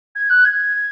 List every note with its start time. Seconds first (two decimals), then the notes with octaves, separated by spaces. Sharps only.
0.15 G#6
0.29 F#6
0.45 G#6